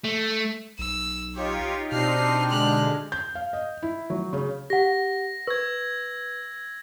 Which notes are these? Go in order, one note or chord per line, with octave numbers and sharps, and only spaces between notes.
A3
B1 E6
D#4 F4 G4 C#5
B2 C4 D4 D#4 G4 F6 C7
D3 G#3 F6 F#6
G6
F5
D#5
E4
F#3
C#3
G4 F#5 A#6
B4 C#6 E6 G#6